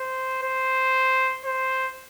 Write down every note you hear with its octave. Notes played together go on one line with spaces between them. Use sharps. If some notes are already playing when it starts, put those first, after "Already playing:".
Already playing: C5
C5
C5